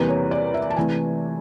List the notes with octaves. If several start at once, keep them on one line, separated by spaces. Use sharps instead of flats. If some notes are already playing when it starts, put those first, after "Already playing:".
Already playing: E2 C3 E3 G3 A#3 B4
C#5
D5
E5
A5
C3 E3 A3 G#5